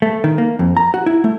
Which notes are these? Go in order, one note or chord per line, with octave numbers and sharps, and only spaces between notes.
A3
D#3
A#3
F2
A#5
F#4
E4
A3